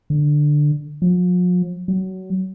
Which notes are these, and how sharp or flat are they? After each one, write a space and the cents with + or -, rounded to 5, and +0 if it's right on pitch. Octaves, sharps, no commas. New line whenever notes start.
D3 +10
F3 +45
F#3 +20